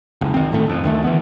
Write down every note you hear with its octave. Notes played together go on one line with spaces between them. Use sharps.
F#1 C#2
D#3 C4
G#1 A2 A3
F1 F2
D2 D#3 A3
E3 B3